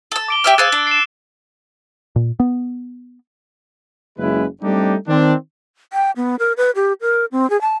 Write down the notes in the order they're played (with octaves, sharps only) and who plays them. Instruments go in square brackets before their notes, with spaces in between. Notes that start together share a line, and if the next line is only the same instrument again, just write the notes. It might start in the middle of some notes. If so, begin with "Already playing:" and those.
[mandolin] A4 E6
[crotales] D6 D7 G7
[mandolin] G4 E5 F6
[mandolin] G#4 C5 F5 [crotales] E6 F#6 A6
[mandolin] D4
[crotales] C7 E7
[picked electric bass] A#2
B3
[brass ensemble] F#1 C#3 G#3 E4 B4
G3 A3 C4 D4 D#4 G4
D#3 C4 D4
[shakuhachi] G5
B3
A#4
B4
G4
A#4
C4
G#4
A5